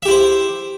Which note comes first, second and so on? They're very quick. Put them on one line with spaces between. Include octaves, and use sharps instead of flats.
E5 G4 E4 C5